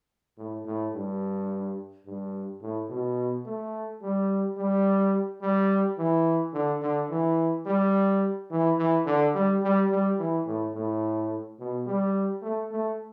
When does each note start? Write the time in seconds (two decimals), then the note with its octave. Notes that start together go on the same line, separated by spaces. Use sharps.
0.37 A2
0.66 A2
0.94 G2
2.06 G2
2.62 A2
2.90 B2
3.46 A3
4.02 G3
4.57 G3
5.42 G3
5.98 E3
6.54 D3
6.82 D3
7.10 E3
7.66 G3
8.51 E3
8.78 E3
9.06 D3
9.34 G3
9.63 G3
9.91 G3
10.19 E3
10.46 A2
10.74 A2
11.59 B2
11.86 G3
12.42 A3
12.71 A3